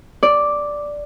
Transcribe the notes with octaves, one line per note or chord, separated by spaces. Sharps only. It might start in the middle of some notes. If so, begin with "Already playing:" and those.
D5